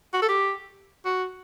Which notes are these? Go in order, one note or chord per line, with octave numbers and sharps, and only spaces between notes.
F#4
A4
G4
F#4